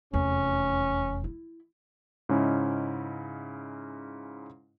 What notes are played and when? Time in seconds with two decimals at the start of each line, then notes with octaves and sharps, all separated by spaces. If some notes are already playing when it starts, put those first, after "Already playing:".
0.13 F1 E2 C#4
1.24 E4
2.29 G#2 C#3 C#4 D#4 E4